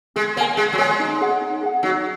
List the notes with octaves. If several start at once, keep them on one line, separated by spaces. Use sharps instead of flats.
G#3 G#4
A#3 C#5
G#5
G#3 G#4
F#3
G#3 C#5 G#5
D#4
G#4 F#5
D#4
G#4 F#5
F#3 D#4